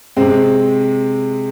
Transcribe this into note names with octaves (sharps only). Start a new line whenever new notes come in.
C3 G#3 C4